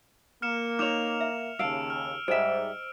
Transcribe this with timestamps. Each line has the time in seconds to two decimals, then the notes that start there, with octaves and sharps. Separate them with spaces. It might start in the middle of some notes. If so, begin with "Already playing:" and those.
0.42 A#3 F6 C#7 E7
0.79 D#4 C#5 C#6 D6 F6 E7 F7
1.21 E5
1.59 D#2 C#3 F5 A5 E6 D7
1.90 F6
2.28 G#2 G3 G#4 C5 D#5 E5 D7